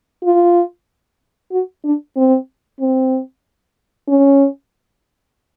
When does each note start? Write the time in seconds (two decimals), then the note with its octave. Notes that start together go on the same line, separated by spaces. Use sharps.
0.24 F4
1.52 F#4
1.85 D4
2.16 C4
2.81 C4
4.09 C#4